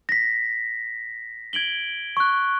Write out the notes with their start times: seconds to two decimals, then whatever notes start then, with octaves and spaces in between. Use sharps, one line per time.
0.09 A#6 B6
1.53 G#6 D7 F#7 G7
2.17 C#6 F#6